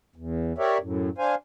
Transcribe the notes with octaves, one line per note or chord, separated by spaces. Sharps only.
E2
G4 A#4 C#5 D5 E5
F#2 A2
D4 C5 F5 G#5